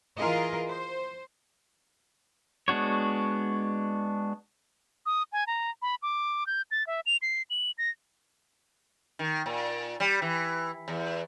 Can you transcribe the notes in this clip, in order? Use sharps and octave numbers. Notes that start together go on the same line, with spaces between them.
E3 F4 G#4 A#4 D#5
C5
G#3 B3 D4 F#4 C#5
D#6
G#5
A#5
B5
D6
G6
A6
E5
F7
C7
F#7
A#6
D#3
A#2
G3
E3
E2